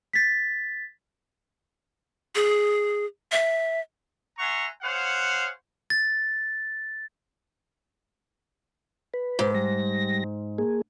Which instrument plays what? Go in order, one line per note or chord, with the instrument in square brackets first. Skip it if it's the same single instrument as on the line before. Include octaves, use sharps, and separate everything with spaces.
[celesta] A6 B6
[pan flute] G#4
E5
[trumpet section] E5 F#5 G#5 A#5 C6 C#6
G#4 C5 C#5 F5 F#5
[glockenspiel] A6
[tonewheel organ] B4
[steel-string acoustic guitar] G#2
[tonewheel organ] G3 A#6
A#3 G#4